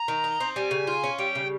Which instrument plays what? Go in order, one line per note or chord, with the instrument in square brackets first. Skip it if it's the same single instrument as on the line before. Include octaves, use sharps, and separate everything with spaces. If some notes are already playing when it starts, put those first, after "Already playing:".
Already playing: [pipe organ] A#5
[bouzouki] D#3
D#4
C4
[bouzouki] G3 [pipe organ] G#5
[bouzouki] C#3
F4
C#4
[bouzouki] G3 [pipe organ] G5
[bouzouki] C#3